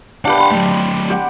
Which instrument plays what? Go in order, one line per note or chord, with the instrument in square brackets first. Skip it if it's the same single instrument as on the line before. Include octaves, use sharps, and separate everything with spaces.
[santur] D4 G4 B4 [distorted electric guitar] F5 F#5
[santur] B5 C6
[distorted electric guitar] F#3 A3
[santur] G4 F#5